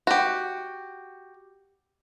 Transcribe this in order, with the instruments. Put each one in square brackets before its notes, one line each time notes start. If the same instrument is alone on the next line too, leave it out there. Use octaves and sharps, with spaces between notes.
[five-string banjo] F#4 G4